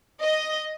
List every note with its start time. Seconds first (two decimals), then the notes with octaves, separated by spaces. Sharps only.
0.22 D#5